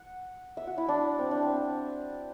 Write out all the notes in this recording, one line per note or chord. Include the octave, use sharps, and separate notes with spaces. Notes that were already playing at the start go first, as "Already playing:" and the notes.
Already playing: F#5
E5
F#4
E4
D4
C4
D4
C4